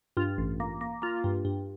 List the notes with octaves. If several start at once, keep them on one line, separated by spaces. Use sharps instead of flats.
G2 F4
A1
A#3
A#3
A#3 F4
G2
G2